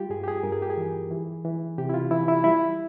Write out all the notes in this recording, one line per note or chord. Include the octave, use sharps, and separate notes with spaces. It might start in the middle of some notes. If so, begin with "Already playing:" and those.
Already playing: G3 F4 G4
G2 G#4
G4
G#4
G2 A#4
G#4
G4
G#4
E3
E3
E3
C3 G4
E4
F4
E3 E4
E4
G3 E4